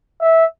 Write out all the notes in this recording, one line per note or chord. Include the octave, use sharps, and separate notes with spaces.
E5